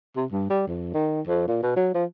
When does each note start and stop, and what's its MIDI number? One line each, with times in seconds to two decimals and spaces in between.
0.16 0.25 48
0.31 0.49 43
0.50 0.63 55
0.67 0.90 41
0.94 1.21 51
1.26 1.43 41
1.47 1.58 46
1.62 1.73 47
1.76 1.91 54
1.94 2.05 53